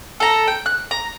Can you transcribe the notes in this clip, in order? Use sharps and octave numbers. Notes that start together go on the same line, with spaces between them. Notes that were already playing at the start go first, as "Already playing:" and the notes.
A4 A#5
G5
F#6
A#5